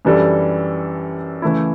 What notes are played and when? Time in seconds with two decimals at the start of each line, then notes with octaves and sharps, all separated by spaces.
0.05 F#2 E3 G3 D4 A4
1.42 C#3 E3 A3 E4